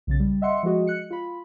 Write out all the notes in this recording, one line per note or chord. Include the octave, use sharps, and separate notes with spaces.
B1 C#3 A6
G3
D#5 E5 F#5 C6 C#7
F3 G#3 F#4 D#5
F#6 C#7
F4 B5